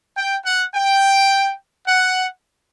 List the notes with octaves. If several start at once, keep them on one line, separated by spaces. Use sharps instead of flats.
G5
F#5
G5
F#5